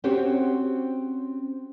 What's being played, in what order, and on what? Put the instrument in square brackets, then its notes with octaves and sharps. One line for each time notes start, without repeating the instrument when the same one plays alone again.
[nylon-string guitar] C4 C#4 F#4 G4 C5 C#5